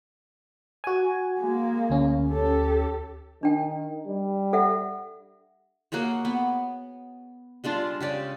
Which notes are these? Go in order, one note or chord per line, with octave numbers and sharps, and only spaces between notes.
F#4 G#5
G#3 A#3
D2 C#4
G4 A4
D#3 D4 G5
G3
A4 E5 F#5
A#3 F#4 G#4 C#5
B3
G3 G#3 D4 F4
C#3 G4 D5